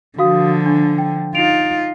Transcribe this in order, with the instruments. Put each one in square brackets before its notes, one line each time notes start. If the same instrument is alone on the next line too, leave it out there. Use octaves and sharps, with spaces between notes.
[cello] D3 F3 [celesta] F#4 F5 D#6
[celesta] D4
G5
[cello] D#4 F4 [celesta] D7 F7